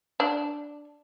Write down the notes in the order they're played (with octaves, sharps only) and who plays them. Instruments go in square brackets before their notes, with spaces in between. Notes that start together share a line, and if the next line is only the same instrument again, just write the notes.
[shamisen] D4